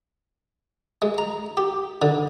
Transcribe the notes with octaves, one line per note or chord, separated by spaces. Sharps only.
G#3
A#5
G4
D3